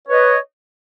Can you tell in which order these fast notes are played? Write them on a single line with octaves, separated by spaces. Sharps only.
C#5 B4 D#5